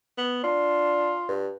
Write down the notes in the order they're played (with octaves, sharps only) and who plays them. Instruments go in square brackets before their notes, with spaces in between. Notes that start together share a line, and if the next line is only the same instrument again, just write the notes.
[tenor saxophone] B3
[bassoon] D4 [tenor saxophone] F4
[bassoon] G2